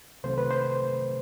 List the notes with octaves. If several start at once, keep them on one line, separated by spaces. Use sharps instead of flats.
C2 C3 D#3 F#3 A3 C5
B4
C5